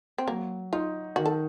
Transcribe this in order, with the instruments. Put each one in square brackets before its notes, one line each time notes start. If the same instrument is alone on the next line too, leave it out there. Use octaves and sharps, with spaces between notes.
[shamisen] C4
[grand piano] F#3 [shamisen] A#3
[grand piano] D#4 [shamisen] F4
[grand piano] D#3 [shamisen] F#4
[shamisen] A4